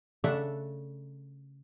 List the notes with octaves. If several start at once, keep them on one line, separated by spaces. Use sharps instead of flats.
C#3 A3 D4 A4 E5 F#5